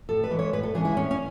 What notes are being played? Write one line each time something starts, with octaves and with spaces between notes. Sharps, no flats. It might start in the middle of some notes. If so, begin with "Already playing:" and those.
A2 A4
B4
E3 G#3 C#4
C#5
A2 B4
A4
E3 G#3 C#4 G#4
E4
A2 C#4
C#4